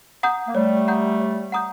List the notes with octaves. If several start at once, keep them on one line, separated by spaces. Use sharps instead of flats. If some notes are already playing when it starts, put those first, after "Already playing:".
F#5 A#5 D#6 G6
A#3
G3 A3 C#5
F#5 A#5 D#6 G6
C#5
F#5 A#5 D#6 G6